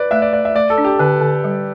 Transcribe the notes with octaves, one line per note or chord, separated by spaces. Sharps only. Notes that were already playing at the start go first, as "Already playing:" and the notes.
Already playing: B4 D5
A3 E5
D5
A3 D5
E5
A3 D5
A4
D4
G4
D3 B4
D3
G3